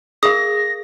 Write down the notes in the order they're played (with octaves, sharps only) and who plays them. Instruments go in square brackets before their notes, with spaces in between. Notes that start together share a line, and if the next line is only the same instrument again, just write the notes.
[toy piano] G#4 A#4 F5 [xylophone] D#6 [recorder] A#6